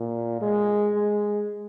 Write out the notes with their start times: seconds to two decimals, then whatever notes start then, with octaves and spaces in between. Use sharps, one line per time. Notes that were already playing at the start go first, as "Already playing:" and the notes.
Already playing: A#2
0.42 G#3
0.95 G#3